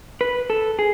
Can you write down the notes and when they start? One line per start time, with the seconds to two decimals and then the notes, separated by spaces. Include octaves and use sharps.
0.21 B4
0.50 A4
0.79 G#4